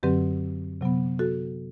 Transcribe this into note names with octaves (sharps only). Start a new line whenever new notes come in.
F#2 D3 F#3 C4 G4 B4
C3 F#3 B3
F#4 A4